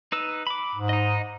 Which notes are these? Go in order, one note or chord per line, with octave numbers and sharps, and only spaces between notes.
D#4 B4 E6
B5 D6
G#2
D#4 D#5